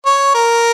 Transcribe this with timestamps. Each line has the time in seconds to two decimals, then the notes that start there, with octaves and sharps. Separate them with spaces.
0.06 C#5
0.35 A#4